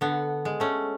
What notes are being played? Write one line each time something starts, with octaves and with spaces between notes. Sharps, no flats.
D3 B3
G#3
A3 C#4